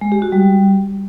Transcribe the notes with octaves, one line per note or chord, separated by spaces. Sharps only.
G#3
G4
F#4
G3